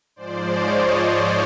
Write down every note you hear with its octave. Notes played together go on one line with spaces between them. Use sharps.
G#2 F3 G#3 C5 D5
C#5 D#5